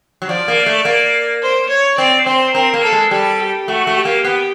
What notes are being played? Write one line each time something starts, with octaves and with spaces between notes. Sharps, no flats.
F#3
F3 D5
A#3
A3
A#3
C5
C#5
C4 D5
C4 C5
C4 A#4
A#3
A4
G#3
G3 A4
G4
A3 F#4
A3
G4
A#3
B3